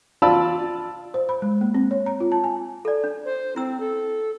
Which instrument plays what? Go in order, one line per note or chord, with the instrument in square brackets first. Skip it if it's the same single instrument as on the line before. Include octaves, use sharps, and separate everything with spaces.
[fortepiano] F4 D5 A5 B5 E6
[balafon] C5
B5
G#3
A#3
C4
C#5
A#5
F4
A5
G#5
[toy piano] A4 D5
D4
[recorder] C5
[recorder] C4 [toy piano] E4 E6
[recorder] A4